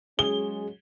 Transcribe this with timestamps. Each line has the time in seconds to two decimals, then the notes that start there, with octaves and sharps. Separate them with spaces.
0.19 F#3 G#3 C#4 G#4 G7